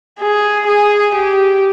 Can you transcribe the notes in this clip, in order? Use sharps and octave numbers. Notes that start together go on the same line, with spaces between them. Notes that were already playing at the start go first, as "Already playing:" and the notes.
G#4
G#4
G4